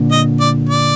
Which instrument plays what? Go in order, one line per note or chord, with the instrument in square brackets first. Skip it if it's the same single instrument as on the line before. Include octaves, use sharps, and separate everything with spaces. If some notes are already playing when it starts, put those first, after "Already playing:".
Already playing: [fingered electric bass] A#2 D3
[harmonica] D#5
D5
D5